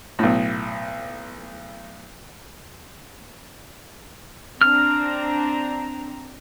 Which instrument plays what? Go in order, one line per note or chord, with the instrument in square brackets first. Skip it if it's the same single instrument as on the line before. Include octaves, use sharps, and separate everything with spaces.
[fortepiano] B1 A2
[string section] C4 D4 A#5 [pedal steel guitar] F6